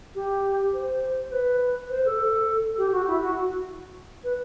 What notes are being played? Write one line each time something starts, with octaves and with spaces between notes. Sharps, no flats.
G4
C5
C5
B4
C5
A4
G4
F#4
E4
F#4
B4